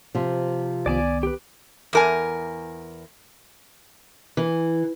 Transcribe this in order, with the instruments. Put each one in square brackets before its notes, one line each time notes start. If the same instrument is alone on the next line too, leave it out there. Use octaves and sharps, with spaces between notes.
[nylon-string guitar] C3 F3
[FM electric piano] C2 D#3 B3 [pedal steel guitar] D5 G#5 D6
[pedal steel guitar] G4 B4
[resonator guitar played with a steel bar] E2 A#4 G#5
[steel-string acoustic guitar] E3